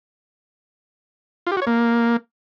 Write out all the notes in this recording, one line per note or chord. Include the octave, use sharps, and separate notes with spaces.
F4
G4
F#4
C#5
A#3